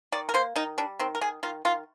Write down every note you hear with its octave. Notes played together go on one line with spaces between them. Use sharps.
D#3 D5
A#4
A#3 C5
D#3 D#4
G3 D4
D#3 C4
A#4
D#3 G#4
D#3 F4
D#3 F4